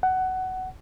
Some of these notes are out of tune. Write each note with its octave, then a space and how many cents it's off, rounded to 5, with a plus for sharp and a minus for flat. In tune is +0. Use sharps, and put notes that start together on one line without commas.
F#5 +15